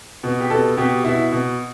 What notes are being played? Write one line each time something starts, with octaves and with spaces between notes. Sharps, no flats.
B2
G4
B2 A4
B2 G4
B2 E4
B2